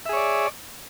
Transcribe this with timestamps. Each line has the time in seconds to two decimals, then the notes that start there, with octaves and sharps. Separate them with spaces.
0.06 E5
0.09 G#4
0.13 C#5
0.17 D5